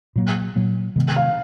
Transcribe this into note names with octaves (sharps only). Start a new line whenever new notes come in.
A#2 F#3 A#3
A#2 F#3 A#3
C3 D#3 G#3 B3
F5